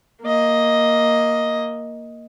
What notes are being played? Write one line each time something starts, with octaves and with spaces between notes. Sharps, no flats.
A#3 D#5